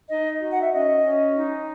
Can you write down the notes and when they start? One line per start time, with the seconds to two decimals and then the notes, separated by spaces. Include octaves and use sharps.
0.08 D#4 D#5
0.40 F#4
0.51 F#5
0.62 E5
0.72 C#4 D#5
1.03 C#4
1.36 D#4